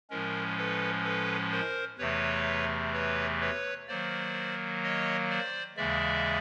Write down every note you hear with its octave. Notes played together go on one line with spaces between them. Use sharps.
A2 F3 G#3 C#4 A#4
A4 B4
A4 B4
A#4 C5
E2 C3 E3 A3 B4 C#5
B4 C#5
B4 C#5
D#3 F#3 A#3 C5 D5
C#5 D#5
C5 D5
D#2 C#3 E3 G#3 D5 E5